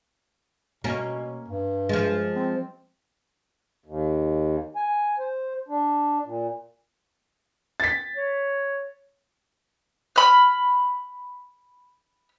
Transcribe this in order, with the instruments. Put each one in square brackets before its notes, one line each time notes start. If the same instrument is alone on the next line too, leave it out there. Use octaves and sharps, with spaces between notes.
[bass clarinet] B2 [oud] A#3 C#4
[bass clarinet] G2
[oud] F3 G#3
[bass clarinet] C4
[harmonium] D#2
G#5
C5
D4
A#2
[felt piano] A6 B6
[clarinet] C#5
[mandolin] B5 F6